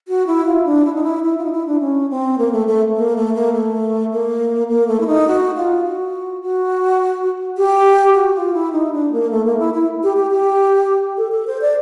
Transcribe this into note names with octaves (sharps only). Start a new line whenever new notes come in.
F#4
E4
F4
D4
E4
D#4
E4
E4
F4
D#4
E4
D4
C#4
C4
A#3
A3
A3
A#3
A3
A#3
A3
A#3
A#3
A3
E4
D#4
F#4
F4
F#4
F#4
G4
F#4
F4
E4
D#4
D4
A#3
A3
A#3
E4
E4
G4
G4
G4
A4
A4
C5
D5